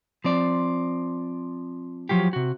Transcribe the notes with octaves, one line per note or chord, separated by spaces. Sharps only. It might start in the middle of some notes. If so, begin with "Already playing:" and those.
F3 C4 D5
F3 F#3 F4 G4
C3 F#4